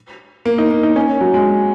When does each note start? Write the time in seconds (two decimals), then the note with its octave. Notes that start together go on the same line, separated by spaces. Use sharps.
0.45 A#3
0.58 D#4
0.71 A#3
0.83 D#4
0.96 C#4
1.21 F#3
1.34 G#3